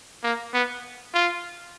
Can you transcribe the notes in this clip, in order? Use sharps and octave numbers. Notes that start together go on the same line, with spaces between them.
A#3
B3
F4